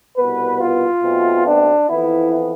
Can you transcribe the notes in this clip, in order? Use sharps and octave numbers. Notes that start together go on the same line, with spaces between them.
C2 B2 B3 B4
F4
B1 B2 A3 C4
D4
F2 E3 B3 E4